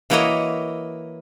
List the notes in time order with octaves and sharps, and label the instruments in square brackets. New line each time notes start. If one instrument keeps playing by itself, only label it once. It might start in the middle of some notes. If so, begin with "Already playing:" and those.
[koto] E3 A#3 E4 F#4 C#5 D#5